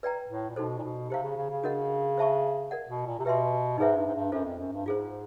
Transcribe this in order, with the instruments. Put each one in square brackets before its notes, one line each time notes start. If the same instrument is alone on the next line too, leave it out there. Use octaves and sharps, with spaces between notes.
[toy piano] B4 D5 G5 A#5
[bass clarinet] A2
A#2
[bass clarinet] B2 [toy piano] D#4 F#4 A4 C5
[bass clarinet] A#2
B2
[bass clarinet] C3 [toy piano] G4 C5 F5
[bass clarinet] C#3
C#3
C#3
[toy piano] D4 F#4 A#4 D#5 F#5
C5 E5 A5 C#6
A#4 D5 F#5
[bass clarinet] B2
A#2
C3
[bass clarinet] B2 [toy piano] G4 B4 E5 G5 C6
[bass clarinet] G#2 [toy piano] D#4 G#4 B4 E5
[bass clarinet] G2
G#2
G2
[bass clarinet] F#2 [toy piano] F4 A4 C5
[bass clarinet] F2
F#2
G2
[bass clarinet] G#2 [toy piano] F4 G#4 C5